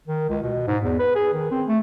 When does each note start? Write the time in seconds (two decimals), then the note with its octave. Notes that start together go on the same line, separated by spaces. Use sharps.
0.07 D#3
0.30 C#2
0.43 B2
0.67 G#2
0.83 E2
0.99 B4
1.15 G#4
1.33 D#3
1.51 C4
1.67 A3